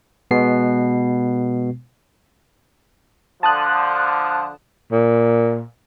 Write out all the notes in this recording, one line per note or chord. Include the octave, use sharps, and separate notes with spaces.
B2 G#3 B3 C7
D3 F3 A5 D#6 F#6
A#2